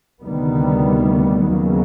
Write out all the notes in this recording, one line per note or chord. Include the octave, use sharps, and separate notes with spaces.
D2 C3 D#3 G3 B3
D#2 C#3 F#3 B3